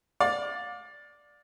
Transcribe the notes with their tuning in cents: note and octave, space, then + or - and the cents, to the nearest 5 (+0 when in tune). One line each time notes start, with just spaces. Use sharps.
D5 +0 F5 +35